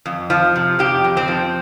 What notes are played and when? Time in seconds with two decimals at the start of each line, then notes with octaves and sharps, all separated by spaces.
0.06 F2
0.30 F3
0.56 C3
0.79 F2 G4
1.04 F2
1.17 C4
1.28 F3